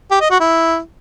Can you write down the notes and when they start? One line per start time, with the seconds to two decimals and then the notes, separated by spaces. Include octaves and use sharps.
0.11 G4
0.21 D#5
0.31 F#4
0.40 E4